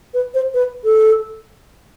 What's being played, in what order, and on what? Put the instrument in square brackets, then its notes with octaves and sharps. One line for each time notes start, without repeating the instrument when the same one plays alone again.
[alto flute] B4
C5
B4
A4